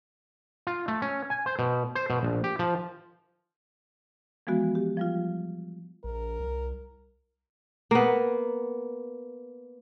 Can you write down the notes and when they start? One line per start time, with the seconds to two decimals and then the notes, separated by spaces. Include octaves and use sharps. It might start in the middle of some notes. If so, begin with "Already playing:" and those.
0.67 F4
0.88 A3
1.02 C#4
1.30 G#5
1.46 C5
1.59 B2
1.95 C5
2.10 B2
2.23 A#1
2.44 G4
2.59 F3
4.47 E3 F3 G#3 B3 F#4
4.75 G4
4.97 F3 G3 F4
6.04 A#1 A#4
6.40 C2
7.91 A#3 B3